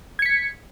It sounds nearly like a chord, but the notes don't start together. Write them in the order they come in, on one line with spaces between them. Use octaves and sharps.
G#6 C#7 B6